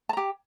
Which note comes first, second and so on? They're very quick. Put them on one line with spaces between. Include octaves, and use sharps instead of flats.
A5 A#5 G4